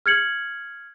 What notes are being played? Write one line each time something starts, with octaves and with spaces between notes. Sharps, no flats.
F6 G#6 C#7 F#7